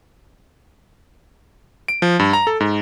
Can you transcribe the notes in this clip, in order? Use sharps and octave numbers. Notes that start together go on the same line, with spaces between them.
D7
F3
G2
A#5
A4
G#2